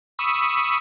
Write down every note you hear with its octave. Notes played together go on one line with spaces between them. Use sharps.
B5 C#6 D#6 E6